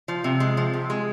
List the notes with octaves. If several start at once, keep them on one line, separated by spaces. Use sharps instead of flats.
F3
C3
G#3
F3
C3
G#3